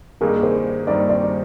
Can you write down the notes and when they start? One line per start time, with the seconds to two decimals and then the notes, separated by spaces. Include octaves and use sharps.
0.21 G2 D#3 G3 A#3 D#4 G#4 A#4
0.43 A#4 C5
0.87 G2 D#3 G3 A#3 D#4 C5 D5
1.09 C5 D5